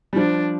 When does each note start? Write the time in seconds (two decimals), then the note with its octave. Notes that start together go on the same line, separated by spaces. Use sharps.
0.13 G3
0.16 F3 D4